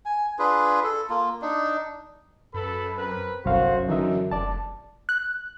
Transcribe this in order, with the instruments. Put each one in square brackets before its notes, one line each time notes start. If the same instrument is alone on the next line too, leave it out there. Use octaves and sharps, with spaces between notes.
[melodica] G#5
D4 F4 G#4 B4
A4
A#3 F4
D4 D#4
[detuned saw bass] F#2 [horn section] A4 B4 B5
[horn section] C4 A#4 B4
[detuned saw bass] G1 [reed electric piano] C2 F5 [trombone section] F#2 [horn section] A3 F#4 C5
[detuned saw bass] D3 [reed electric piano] E3 E5 [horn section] D#4
[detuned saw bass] F1 [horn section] G2 D3 [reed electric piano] D5 A5
[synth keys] F#6